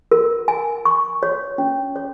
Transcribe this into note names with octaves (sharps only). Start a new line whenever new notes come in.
A#4
G#5
C#6
C#5
C#4
C#5